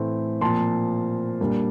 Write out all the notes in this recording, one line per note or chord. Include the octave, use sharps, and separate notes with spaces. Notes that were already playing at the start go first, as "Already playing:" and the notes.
Already playing: A2 E3 A3 C4
A#2 F3 C4 A5 C6
A#2 G3 A#3 D4